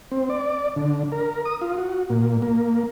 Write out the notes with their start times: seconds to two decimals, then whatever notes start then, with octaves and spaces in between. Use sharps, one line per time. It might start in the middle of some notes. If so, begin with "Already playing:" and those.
0.11 C4
0.30 D5
0.76 D3
1.12 A#4
1.45 D#6
1.61 F4
1.78 F#4
2.10 A#2
2.42 A#3